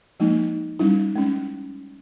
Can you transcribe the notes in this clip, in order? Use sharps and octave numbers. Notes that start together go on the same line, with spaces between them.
F3 G#3 A#3 D#4
G3 C#4 D#4 E4
G#3 C#4